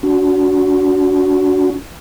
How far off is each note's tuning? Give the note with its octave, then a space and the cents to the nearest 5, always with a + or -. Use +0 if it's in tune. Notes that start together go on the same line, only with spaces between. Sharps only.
D4 -35 F#4 +0